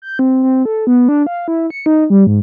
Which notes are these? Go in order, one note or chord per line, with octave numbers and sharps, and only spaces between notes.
G6
C4
C4
A4
B3
D4
F5
E4
C#7
D#4
G3
G#2